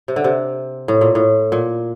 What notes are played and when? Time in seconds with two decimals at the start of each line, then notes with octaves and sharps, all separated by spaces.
0.08 C3
0.16 D3
0.24 C3
0.88 A2
1.01 A#2
1.15 A2
1.52 A#2